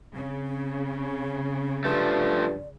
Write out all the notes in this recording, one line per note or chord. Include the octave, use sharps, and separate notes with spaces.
C#3 C4
G2 F3 A3 D5